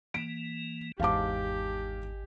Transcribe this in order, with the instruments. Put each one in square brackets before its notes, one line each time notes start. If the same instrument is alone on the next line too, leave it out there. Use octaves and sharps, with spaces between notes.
[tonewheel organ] E3 A#3 [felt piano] D7
[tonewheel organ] G#1 [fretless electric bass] E2 G#2 [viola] G4 [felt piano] F5 A5 D6